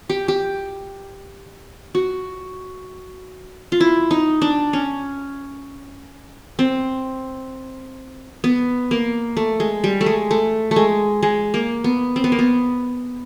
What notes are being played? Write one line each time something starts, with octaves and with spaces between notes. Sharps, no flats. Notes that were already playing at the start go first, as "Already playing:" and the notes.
G4
G4
F#4
F4
E4
D#4
D4
C#4
C4
B3
A#3
A3
G#3
G3
A3
G#3
A3
A3
G#3
G#3
A#3
B3
C4
B3
A#3
B3